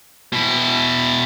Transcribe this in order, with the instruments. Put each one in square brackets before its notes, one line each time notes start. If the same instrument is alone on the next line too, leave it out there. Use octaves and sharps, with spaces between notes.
[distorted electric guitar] B2 E4